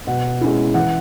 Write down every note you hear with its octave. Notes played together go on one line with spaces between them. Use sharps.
B2 F#5
G#3 C#4 E4
E3 F#5